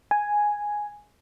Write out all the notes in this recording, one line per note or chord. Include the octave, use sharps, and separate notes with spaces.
G#5